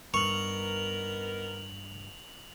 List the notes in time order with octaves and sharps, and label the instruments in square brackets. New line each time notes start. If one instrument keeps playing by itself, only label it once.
[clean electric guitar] G2 [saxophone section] B3 D#4 A#4 [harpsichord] C#6 [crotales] F7 F#7